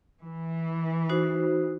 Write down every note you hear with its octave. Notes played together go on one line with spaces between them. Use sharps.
E3
D#4 F#4 C5